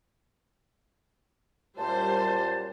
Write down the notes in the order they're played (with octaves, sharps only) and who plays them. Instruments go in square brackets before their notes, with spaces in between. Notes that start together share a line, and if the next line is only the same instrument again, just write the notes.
[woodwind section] F#2 A#2 A5 [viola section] G3 C5